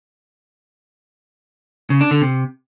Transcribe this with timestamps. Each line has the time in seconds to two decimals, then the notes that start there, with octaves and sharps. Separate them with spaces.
1.90 C#3
2.01 D4
2.11 D3
2.22 C3